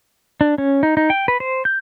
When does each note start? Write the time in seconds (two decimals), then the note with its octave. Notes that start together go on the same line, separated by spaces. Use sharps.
0.41 D4
0.58 C#4
0.83 D#4
0.97 D#4
1.10 G5
1.28 B4
1.40 C5
1.65 G6